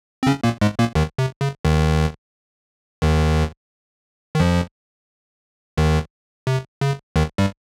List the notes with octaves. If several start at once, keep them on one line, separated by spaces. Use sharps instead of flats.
C4
C#3 C#4
A#2 A#3
G#2 G#3
A#2 A#3
D#2 D#3
C3
C#3
D#2 D#3
D#2 D#3
D#3
F2 F3
D#2 D#3
C3
C#3
D#2 D#3
G2 G3